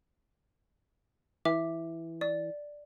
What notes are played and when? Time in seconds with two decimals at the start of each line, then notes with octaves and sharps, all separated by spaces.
1.45 E3 E5 D6
2.21 D5